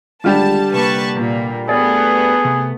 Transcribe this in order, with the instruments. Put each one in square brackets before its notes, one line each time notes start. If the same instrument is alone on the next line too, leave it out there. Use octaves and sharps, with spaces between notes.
[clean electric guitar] D#2 G#3 F4 [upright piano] D3 G3 G4 [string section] A5
[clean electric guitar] C2 A#3 [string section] B4 A5 C#6
[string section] A#2
[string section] A3 B3 [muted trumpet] G#4 [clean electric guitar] A#4 D5
[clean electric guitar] C3